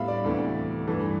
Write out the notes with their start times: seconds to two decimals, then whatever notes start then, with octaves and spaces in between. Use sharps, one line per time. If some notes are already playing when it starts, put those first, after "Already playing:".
Already playing: A2 G3 B3 E5 F5 B5
0.08 D5
0.24 D2 C3 E3 A3
0.87 G2 E3 A3